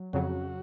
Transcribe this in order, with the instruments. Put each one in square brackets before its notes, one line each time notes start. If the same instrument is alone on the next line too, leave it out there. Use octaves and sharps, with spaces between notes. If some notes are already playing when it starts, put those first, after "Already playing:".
Already playing: [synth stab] F#3
[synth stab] F2 C#3 F#3 [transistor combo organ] F#4